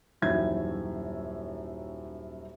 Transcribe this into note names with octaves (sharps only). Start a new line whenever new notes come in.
D#1 F#2 D#3 E3 E5 G#6